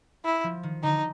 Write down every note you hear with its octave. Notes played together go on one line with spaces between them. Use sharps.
E4
F3
D#3
D3 D#4